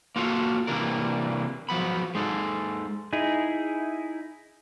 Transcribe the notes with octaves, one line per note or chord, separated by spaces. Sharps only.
A#3 F4 F#4 A4 D5 F5
C3 E3 G3 A#3 D4 A#4
F3 F#3 B3 B5
G#3 D#4 A4
D#4 E4 G#4